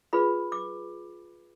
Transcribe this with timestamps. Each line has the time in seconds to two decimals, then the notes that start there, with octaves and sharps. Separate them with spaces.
0.13 F4 G#4 B4 B5
0.52 D6